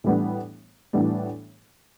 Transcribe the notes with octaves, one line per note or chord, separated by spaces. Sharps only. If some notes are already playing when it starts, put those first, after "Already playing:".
A2 E3 G3 B3 D4
A2 E3 G3 B3 D4